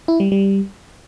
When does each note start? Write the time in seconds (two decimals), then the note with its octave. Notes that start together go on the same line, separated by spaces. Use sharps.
0.08 E4
0.20 G3
0.32 G3